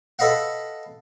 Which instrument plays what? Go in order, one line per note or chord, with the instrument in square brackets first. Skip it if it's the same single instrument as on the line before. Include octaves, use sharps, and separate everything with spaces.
[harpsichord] A4 B4 D#5 F5 F#5